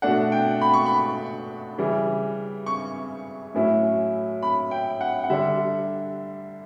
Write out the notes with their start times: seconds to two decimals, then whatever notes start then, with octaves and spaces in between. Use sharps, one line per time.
0.02 B2 A3 D4 F#5
0.32 G5
0.61 B5
0.74 C#6
0.86 B5
1.78 C#3 E3 G3
2.66 C#6
3.54 A2 F#3 C#4 E4
4.43 B5
4.71 G5
5.01 F#5
5.24 F#5
5.30 D3 G3 D4 E5